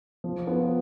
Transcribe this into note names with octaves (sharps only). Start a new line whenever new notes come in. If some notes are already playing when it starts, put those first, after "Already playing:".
F3
B3 F4 B4